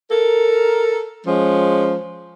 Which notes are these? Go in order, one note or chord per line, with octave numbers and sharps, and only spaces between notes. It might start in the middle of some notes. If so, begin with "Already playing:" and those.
A4 A#4
F3 G#3 C#4